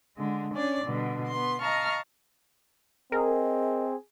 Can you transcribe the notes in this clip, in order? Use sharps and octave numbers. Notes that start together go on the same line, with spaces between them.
D3 G#3
C#4 D4 C#5 D5
B2 D3 G3
B3 C6
D#5 F5 A5 A#5 C#6 F6
C4 G#4 A#4 D#5